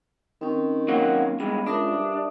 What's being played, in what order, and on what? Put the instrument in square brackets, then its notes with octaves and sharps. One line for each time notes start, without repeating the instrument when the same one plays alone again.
[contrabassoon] D#3 [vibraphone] C4 C#4
[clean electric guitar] F#3 A#3 F#4
[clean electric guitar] E2 G2 G#3 [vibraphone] B5
[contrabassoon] C#2 [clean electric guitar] D4 [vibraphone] A#4 E5 D#6
[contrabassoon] G2